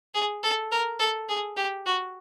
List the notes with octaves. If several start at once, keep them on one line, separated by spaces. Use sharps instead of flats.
G#4
A4
A#4
A4
G#4
G4
F#4